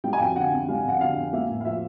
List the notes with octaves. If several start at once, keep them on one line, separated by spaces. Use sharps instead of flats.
G3 G5
G#5
F2 G5
D3 F#5
F2
G3 F5
F2 F#5
D3 F5
F2
A#3 E5
A2
F5
F3 E5